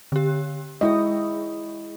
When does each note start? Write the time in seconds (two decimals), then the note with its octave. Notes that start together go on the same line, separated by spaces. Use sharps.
0.12 D3 G4
0.81 G#3 E4 G#4 D#5